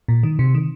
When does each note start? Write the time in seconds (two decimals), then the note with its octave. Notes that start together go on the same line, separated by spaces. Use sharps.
0.08 A#2
0.23 D#3
0.39 C3
0.54 D#3